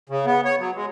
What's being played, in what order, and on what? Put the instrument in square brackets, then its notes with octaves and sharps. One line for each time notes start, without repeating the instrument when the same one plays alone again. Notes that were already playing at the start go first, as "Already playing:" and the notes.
[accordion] C#3
B3
C#5
F#3
G#3